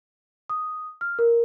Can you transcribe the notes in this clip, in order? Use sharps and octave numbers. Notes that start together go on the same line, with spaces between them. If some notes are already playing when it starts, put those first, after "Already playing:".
D#6
F6
A#4